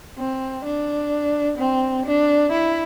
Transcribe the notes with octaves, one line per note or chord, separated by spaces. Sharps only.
C4
D4
C4
D4
E4